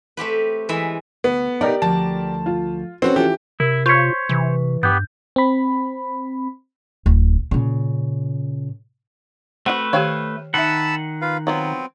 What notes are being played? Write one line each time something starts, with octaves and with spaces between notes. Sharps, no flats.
A3 C4 G4 B4
E3 G#3 B4 E5
D2 B3
D#4 G4 A#4 D5
D2 F3 A5
F4
C4 C#4 F#4 A4 B4 C#5
E3 F3 G4
C3 E4 A#4
F4 C5 C#5 C#6 B6
C3 E3
G2 B3 G4 G6
C4 B5
D1
A#2 C#3
A3 C4 F#4 B4 F#5
D#3 G4 C#5 F5 G5
D#3 D#4 E5 F#5 A5 B5 E6
F4 B4 F5
F#3 B3 C4 F4